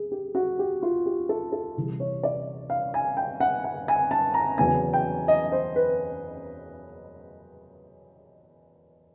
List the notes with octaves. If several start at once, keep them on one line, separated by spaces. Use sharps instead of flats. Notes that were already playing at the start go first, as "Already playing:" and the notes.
Already playing: G#4
G4
F#4
G4
F4
G4
A4
A4
C3 E3 G3
C#5
D5
F5
G#5
G5
F#5
F#5
G#5
A5
A#5
E2 C#3 F#3 B3 G#5
G5
D#5
C5
B4